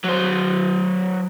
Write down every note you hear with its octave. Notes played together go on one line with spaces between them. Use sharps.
F#3 C5